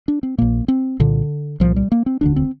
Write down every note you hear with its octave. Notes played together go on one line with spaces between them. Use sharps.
D4
C4
A#1 A#2 A#3
C4
C2 A#2 D3
C2 A#2 F3
G3
A#3
C4
E1 D2 D3 D4
C4